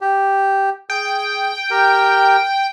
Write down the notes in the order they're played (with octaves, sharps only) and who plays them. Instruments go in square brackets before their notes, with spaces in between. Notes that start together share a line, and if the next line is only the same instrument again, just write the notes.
[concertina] G4
[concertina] G#4 [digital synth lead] G5
[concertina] G4 A#4